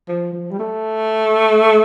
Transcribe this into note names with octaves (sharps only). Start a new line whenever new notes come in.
F3
F3
G3
A3